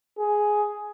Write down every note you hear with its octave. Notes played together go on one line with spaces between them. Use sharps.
G#4